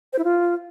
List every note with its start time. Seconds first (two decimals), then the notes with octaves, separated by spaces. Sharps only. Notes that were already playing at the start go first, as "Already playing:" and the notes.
0.13 C5
0.19 E4
0.24 F4